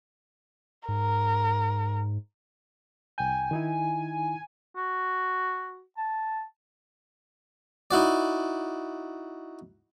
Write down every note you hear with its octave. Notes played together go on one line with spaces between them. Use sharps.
G#2 A#4
C2 G5 G#5 G6
D#3 D#4 E4
F#4
A5
D#4 E4 F#4 D5